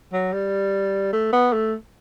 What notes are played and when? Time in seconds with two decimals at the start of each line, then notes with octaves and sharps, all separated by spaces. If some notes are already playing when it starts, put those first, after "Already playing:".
0.13 F#3
0.33 G3
1.13 A3
1.33 B3
1.53 A3